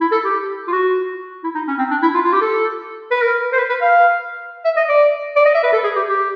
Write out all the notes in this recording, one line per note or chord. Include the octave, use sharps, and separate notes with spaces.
E4
A4
G4
F4
F#4
E4
D#4
C#4
C4
D4
E4
F4
F4
G4
A4
B4
A#4
C5
B4
B4
F5
E5
D#5
D5
D5
D#5
E5
B4
A4
G#4
G4
G4